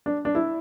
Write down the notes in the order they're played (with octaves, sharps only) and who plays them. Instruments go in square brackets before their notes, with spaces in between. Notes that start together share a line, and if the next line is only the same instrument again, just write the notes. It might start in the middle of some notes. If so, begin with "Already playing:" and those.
[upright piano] D4
D4
E4